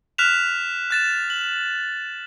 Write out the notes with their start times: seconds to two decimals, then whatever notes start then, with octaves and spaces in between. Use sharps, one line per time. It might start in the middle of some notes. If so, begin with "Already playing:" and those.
0.18 F6 F#6 B6 E7 F7
0.91 F#6 A6 E7
1.30 F#7